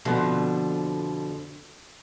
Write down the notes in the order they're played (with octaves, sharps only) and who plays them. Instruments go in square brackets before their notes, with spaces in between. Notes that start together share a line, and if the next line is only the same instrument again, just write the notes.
[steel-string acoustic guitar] F2 B2 D3 F3